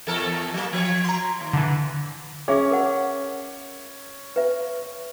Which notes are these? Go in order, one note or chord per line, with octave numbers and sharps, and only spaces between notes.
E2 A4 A#4
F#3 A#3
F3 C#5
A#5 C6
D#2
D3 E3
C#4 G#4 E5 D6
A#4 F#5
B4 E5